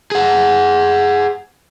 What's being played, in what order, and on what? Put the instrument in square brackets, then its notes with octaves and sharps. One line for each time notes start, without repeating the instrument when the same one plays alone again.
[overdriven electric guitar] G#4 F#5